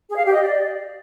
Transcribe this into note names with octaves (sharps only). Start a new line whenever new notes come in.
G#4
F5
G4
D#5
D5